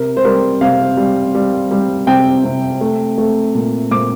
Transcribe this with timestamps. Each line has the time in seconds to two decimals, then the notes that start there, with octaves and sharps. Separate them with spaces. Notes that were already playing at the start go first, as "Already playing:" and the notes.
Already playing: C3 A#4
0.17 C5
0.24 G3 A#4
0.61 C3 F5
0.97 G3
1.34 G3
1.71 G3
2.07 C3 G5
2.45 C3
2.81 A3
3.18 A3
3.55 A#2
3.91 A#2 D6